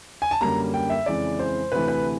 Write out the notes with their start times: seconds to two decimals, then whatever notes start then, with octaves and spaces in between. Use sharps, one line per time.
0.22 G#5
0.31 A5
0.41 F#2 D3 G3 A#3 A#5
0.74 G5
0.90 E5
1.06 F2 C#3 E3 G#3 D5
1.39 C5
1.72 D2 C3 E3 A3 B4
1.88 B4